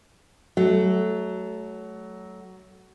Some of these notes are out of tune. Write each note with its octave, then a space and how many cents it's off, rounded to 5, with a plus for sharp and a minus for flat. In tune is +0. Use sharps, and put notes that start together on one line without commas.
F#3 +15 A3 -15